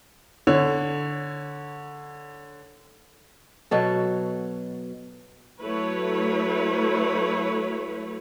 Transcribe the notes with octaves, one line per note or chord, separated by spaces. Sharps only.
D3 C#5
B2 F#3 A4
F#3 A3 E4 B4 C#5